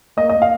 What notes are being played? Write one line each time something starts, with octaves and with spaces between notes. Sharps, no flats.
A#3 D#5
A#3 D#5
F5